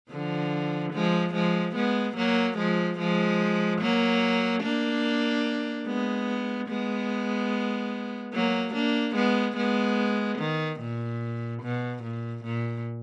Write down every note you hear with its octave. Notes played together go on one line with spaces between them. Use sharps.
D3 F3
F3 G#3
F3 G#3
G#3 B3
F#3 A#3
F3 G#3
F3 G#3
F#3 A#3
A#3 D4
G#3 B3
G#3 B3
F#3 A#3
A#3 D4
G#3 B3
G#3 B3
D#3
A#2
B2
A#2
A#2